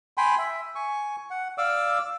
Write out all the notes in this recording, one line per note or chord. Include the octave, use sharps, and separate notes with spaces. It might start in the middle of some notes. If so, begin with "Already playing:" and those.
G5 G#5 B5 C6
E5
G#5 C#6
F#5
D5 F5 D6 E6